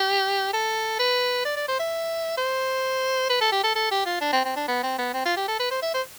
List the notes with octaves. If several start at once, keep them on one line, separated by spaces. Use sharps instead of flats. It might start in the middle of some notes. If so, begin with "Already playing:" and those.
Already playing: G4
A4
B4
D5
D5
C5
E5
C5
B4
A4
G4
A4
A4
G4
F4
D4
C4
C4
D4
B3
C4
B3
C4
F4
G4
A4
B4
C5
E5
C5